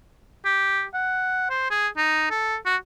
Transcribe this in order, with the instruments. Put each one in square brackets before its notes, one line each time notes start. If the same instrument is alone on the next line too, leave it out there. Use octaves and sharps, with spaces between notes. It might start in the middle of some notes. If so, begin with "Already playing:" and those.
[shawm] G4
F#5
C5
G#4
D#4
A4
F#4